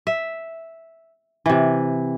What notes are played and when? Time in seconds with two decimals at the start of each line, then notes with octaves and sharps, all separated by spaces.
0.07 E5
1.46 C3 E3